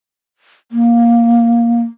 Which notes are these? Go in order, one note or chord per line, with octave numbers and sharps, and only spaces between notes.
A#3